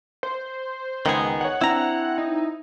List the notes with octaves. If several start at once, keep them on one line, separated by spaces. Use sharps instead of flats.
C5
C#2 D#3 B3 G#4
C#5 D#5 F#5
C4 D4 E4 A#5
D#4